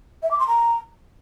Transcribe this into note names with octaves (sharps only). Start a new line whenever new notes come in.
E5
D6
C6
A#5